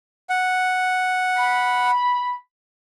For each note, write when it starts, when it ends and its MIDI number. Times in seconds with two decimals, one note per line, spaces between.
0.29 1.91 78
1.37 2.35 83